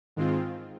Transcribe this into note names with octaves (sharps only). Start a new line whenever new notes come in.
G#2 D#3 G#3 C4 F4